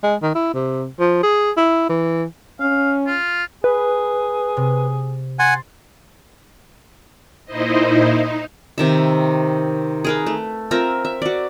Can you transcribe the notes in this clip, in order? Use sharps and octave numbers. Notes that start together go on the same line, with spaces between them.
G#3
D#3
E4
C3
F3
G#4
E4
E3
C#4 F5
F4
G#4 B4
C3
F#5 G#5 C6 A6
A#2 D#4 E4 C5 D#5
D#4
C3 D#3 E5
G#4 A#4 B4
A3
C4 F4 A#4 E5
E5
F#4 D5